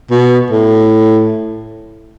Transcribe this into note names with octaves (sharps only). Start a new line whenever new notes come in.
B2
A2